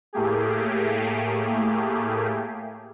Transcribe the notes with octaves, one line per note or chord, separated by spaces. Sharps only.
A2 A3 A#3 G4 G#4